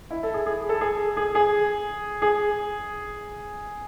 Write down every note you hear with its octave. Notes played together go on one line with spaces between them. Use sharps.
E4
A4
G#4
G#4
A4
G#4
G#4
G#4
G#4